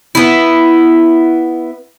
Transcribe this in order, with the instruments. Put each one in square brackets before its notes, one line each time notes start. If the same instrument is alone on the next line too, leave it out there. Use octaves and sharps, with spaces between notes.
[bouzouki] B3 E4